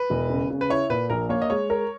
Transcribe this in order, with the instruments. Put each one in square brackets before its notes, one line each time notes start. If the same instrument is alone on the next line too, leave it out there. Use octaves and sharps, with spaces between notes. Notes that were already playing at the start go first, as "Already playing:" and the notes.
Already playing: [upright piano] B4
[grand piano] E1
C#3
C#3
[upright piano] B4
[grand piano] E4 [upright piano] C#5
[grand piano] A#2 [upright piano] B4
[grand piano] A#1 [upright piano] A#4
[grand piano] A#3 [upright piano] C#5
[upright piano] D#5
[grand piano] G#3 [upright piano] C#5
[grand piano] A#4